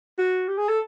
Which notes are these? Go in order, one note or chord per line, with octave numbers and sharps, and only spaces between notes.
F#4
G4
G#4
A4